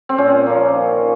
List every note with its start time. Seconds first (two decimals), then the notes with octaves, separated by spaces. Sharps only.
0.09 C4
0.18 A#2 C#4
0.46 F3 A#3
0.75 D#3